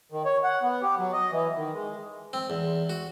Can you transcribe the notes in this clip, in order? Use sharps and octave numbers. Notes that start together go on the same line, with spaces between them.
D#3
C#5
F#5
B3
G4
F#3
D#5
E3
D#3
G#3
C4
E2
F#4